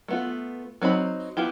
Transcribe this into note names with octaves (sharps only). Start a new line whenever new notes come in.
A3 B3 F4
F#3 C4 D#4 B5
B3 E4 F4 G4